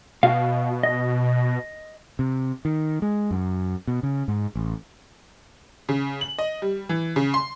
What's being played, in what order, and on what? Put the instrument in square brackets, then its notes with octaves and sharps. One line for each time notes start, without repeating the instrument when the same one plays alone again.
[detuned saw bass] B2 [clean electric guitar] F#4 F5
[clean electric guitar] D#5
[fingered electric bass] C3
D#3
G#3
F#2
B2
C#3
G#2
A1
[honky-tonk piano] C#3
F#7
D#5
G3
E3
C#3
C6